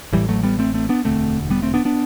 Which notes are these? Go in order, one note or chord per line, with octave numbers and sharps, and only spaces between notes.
A1 A2 E3 G3
F#3 A3
G3 B3
A3 C4
A3 C4
B3 D4
E1 D2 D3 A3 C4
G3 B3
A3 C4
B3 D4
B3 D4